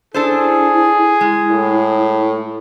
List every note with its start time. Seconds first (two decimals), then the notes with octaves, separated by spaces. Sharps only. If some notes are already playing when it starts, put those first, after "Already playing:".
0.14 D4 E4 G#4 A4 C5
1.21 G#3
1.51 A2